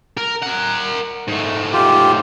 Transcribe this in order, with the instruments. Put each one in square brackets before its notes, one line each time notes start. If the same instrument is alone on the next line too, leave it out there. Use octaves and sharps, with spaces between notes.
[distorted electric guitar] A#4
A#4 F#5
G#2 A3
[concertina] F4 G4